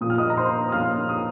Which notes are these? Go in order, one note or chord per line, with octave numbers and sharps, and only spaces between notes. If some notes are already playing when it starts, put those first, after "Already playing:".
A#2 F3 A#3 D#6
F6
D#5 D#6
A#5
C5 C6
D#6
A#2 F3 A#3 F5 F6
D#6